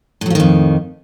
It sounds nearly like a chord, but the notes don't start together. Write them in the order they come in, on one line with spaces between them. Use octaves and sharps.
A2 F#3 F3 D#3 F2